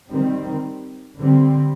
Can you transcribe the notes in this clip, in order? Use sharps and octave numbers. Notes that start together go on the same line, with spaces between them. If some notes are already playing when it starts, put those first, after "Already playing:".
D#3 G3 C4
D3 G3 C4